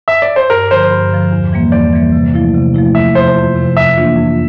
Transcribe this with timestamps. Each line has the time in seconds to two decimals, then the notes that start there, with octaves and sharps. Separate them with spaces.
0.08 E5
0.22 D5
0.36 C5
0.50 G2 A#4
0.71 D3 F3 C5
0.91 G2
1.11 D3 F3
1.32 E2
1.52 E3 G3 A#3
1.72 E2 D5
1.93 E3 G3 A#3
2.12 C3
2.34 F3 A3 E4
2.54 C3
2.74 F3 A3 E4
2.95 F2 E5
3.15 C3 F3 C5
3.35 F2
3.56 C3 F3
3.76 F2 E5
3.97 E3 A#3 D4 F4
4.17 F2